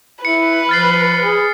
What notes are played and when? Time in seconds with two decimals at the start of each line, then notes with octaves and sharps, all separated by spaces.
0.25 E4 B4 C#7
0.69 F3 F6 A6 C7
1.22 G#4